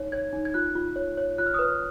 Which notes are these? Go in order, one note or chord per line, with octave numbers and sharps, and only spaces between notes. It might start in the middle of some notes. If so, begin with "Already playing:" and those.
Already playing: D#4 C#5
C#5 G#6
D#4
G#6
F4 F#6
F4
C#5
C#5
F4 F#6
F6
D#6
B4 F6